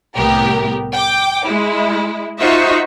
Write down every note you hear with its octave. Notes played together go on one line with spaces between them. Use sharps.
C2 A2 B3 G4 A#4
G5 D6
G#3 E4
D#4 F4 F#4 C5 E5 C#6